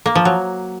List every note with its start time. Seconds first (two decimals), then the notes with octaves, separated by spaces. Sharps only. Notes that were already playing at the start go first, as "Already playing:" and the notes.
0.06 A#3
0.15 F3
0.25 F#3